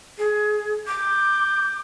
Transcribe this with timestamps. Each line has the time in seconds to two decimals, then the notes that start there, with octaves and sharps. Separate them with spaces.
0.18 G#4
0.87 D6 G6